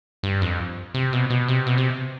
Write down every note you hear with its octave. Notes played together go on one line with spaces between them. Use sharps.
G2
F2
C3
B2
B2
C3
B2
C3